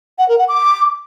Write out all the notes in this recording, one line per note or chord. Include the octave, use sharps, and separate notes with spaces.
F#5
A#4
F#5
D6